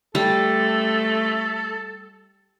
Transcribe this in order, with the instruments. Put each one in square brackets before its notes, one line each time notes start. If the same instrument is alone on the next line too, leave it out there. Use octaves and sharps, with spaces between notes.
[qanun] G3 [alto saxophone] A3 [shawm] A4